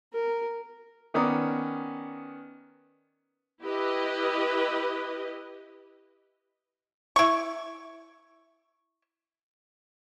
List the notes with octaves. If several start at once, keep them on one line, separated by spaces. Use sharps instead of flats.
A#4
D#3 B3 C#4 D5 A#5 D#6
E4 G4 B4 D#5
E4 C#6